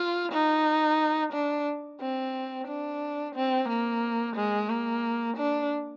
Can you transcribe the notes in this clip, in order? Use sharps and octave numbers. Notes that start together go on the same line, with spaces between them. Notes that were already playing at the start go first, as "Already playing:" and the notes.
Already playing: F4
D#4
D4
C4
D4
C4
A#3
G#3
A#3
D4